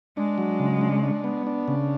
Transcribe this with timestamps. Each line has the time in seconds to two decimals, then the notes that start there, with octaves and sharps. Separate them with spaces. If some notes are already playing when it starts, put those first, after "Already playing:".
0.17 G#3 D4
0.38 F#3
0.60 C#3
0.81 D4
1.03 D4
1.24 B3
1.47 D4
1.68 C#3